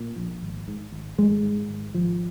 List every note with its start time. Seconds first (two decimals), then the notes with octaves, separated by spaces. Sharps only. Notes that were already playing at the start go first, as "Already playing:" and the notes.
Already playing: A#2
0.16 A#1
0.42 G#1
0.68 G#2
0.92 G#1
1.18 G#1 G#3
1.43 G#2
1.69 G#1
1.94 G#1 F3